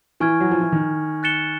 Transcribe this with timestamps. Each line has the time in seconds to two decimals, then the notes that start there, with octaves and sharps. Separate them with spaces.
0.20 E3 G#5 C#6 F6 G#6
0.40 F#3
0.51 F3
0.61 E3
0.72 D#3
1.23 F#6 A6 C#7 E7 G7